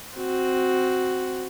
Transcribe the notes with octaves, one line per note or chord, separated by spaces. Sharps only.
C4 F#4